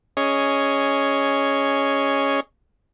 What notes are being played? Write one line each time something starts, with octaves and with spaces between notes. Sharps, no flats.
C#4 G#4 C#5 D#5